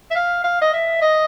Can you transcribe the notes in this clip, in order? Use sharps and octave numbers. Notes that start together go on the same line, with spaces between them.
E5
F5
F5
D#5
E5
D#5